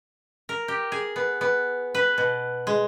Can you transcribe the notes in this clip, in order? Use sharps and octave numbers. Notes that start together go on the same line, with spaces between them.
A#4
G4
G#4
B3
B3
B4
B2
G#3